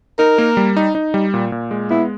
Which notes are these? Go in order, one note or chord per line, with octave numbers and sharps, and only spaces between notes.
D#4 A#4
A#3
G3
D#4
D#4
G3
A#2
A#2
G#3
B3 E4